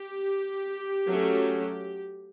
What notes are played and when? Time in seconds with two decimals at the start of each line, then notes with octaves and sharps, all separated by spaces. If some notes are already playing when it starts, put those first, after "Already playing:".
Already playing: G4
1.07 F#3 A3 C#4